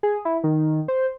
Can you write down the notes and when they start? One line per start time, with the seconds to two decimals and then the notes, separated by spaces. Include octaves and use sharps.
0.03 G#4
0.25 E4
0.44 D#3
0.88 C5